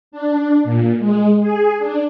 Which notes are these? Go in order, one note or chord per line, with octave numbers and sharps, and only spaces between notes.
D4
A#2
G#3
G#4
D4